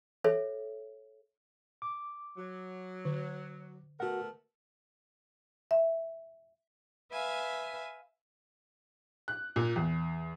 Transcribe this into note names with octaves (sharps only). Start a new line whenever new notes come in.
A4 C#5 E5
D6
F#3
D3
A3 B3 F#4 A#4 F#5
E5
B4 E5 F5 G#5
F#6
A#2
E2